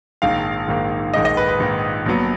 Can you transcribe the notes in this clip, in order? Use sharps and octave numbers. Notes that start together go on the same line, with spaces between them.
A#1 G#2 D#3 A#3 F5
A#1 G#2 D#3 A#3
A#1 G#2 D#3 A#3 D#5
D#5
B4
B4
A#1 G#2 D#3 A#3
A#1 A#2 F#3 B3